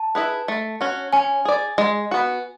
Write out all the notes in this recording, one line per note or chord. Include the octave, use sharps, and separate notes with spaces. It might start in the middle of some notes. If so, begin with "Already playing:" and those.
Already playing: A5
E4 G#4 B4
A3
C#4 F#4
C#4 G#5
G#4 D5
G#3
B3 F#4